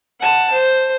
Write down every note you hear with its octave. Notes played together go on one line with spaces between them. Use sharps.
F#5 A5
C5